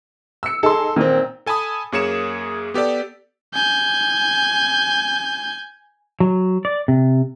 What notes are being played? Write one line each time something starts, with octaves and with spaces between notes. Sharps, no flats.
E6 C#7
D#4 G#4 A4 C6
A#2 D#3 C4
A4 G#5 A5 B5 D#6
F#2 A#3 G#4 C#5 C#7 E7
B3 G4 A4 D5
G#5 G6
F#3
D5
C3